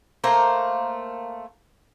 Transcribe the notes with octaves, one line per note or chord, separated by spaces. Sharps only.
A3 A#3 C5 A#5